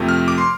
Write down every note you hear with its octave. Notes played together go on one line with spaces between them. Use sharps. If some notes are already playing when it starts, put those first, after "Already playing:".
Already playing: F2 C3 F3 A3
F6
D6
C6